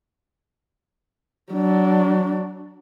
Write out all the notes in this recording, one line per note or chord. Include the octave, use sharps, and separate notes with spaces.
F#3 D4